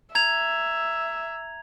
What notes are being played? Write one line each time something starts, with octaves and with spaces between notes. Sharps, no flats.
E5 A#5 G#6 F7